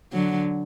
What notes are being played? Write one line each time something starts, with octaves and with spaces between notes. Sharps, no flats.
D3 F#3